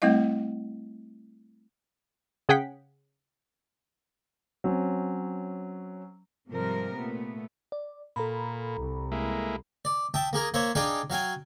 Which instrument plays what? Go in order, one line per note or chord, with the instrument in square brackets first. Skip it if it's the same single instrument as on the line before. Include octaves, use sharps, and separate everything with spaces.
[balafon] G3 A3 C4 E4 D#5 F5
[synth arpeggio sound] C#3 G#4 F#5 G5 B6
[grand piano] F#3 C4 C#4
[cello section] G#2 C3 F3 G3 A#4
A#2 A3 B3
[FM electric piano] D5
[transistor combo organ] A#2 [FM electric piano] A4 A#5 B5
[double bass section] C2
[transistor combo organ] G#3 A#3 E4
[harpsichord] D5
E5 G5 A5 D#6
A#3 G#4 A#4
A#3 C5 C#5 E5
D4 D#4 G#4 D5 F5 G5
F#3 F5 G5 G#5